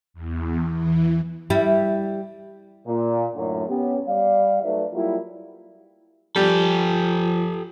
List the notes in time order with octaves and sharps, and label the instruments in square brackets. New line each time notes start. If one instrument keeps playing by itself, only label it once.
[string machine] E2
E3
[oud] G3 E4
[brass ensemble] A#2
F#2 A2 D3
B3 C#4 G4
G3 D5 F5
F#3 A3 D#4 B4 D5 E5
F#3 G3 A#3 E4 F4
[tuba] F3 [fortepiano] G3 [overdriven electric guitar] G4 A4